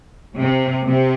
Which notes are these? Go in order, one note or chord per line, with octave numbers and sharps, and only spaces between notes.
C3
C3